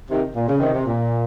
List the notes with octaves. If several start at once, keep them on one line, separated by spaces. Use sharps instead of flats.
C3 D#3
A#2
C#3
C3 D#3
C3
A#2